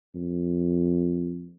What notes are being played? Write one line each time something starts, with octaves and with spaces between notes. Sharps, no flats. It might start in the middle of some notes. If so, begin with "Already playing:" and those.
F2